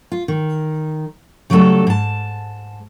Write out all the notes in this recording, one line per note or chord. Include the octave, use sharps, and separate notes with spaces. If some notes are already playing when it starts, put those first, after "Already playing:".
F4
D#3
C#3 F#3 G3 A3 A4
G#2 A5